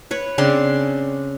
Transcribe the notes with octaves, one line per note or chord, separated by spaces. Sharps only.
B4 C#5
C#3 C4 D4 C6